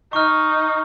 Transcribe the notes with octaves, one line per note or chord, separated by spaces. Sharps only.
D#4 C#6 F6